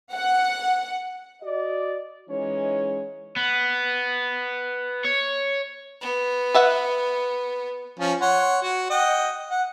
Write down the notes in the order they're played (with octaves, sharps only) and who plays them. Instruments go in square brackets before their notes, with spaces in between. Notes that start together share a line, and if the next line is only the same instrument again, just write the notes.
[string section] F#5
[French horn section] F#4 D5 D#5
E3 G#3 C#4 D#4 C#5
[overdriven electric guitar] B3
C#5
[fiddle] B3
[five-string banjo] B4 E5 F#5
[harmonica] F3 C#4
C#5 F#5 C6
F#4
D#5 F#5 G5
F#5